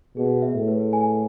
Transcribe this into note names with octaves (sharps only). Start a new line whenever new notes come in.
B2 G#4
E5
A2
B4
G#5